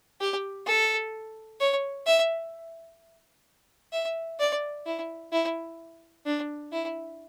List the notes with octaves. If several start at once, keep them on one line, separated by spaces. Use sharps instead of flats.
G4
A4
C#5
E5
E5
D5
E4
E4
D4
E4